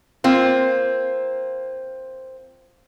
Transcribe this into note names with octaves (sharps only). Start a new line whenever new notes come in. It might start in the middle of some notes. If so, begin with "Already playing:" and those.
A#3 C4 F4